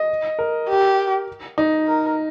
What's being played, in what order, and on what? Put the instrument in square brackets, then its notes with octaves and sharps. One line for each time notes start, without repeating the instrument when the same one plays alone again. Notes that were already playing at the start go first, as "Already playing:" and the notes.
Already playing: [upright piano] D#5
A#4
[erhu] G4
[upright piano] D#4
[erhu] A#4